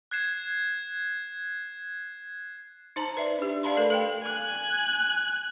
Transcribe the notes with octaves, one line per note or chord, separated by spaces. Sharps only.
F#6 G#6 C7 E7
D#4 C5 A5 A#5
B4 D5 E5
D4 G4
B4 D5 F5 A5 B5 C6
A3 A4 A#4 D5
A4 F5 G5
G#5 F#6